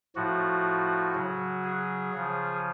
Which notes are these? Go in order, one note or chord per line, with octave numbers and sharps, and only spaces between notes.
A2 F3 F#4
C#3 F#3
G#4
C#3 F3